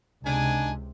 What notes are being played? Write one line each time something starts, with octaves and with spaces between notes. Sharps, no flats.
C#2 C3 D4 D#4 G#5